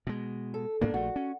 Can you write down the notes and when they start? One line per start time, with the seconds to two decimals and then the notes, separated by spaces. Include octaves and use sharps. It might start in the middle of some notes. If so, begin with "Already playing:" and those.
0.07 B2 G#3
0.54 A4
0.81 G#2 A#3 B3 D4
0.94 A#1 A3 F#4
1.16 C#4